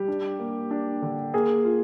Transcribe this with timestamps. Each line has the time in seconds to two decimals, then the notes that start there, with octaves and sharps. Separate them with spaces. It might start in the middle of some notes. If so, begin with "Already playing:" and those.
Already playing: G3 G4
0.08 D4
0.39 A#3
0.71 D4
1.02 D3
1.34 A#3 G#4
1.64 F4